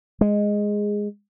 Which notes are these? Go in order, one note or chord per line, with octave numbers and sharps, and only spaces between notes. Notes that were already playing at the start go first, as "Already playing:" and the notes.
G#3